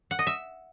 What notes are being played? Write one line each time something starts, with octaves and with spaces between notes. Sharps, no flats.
F#5
D#5
E5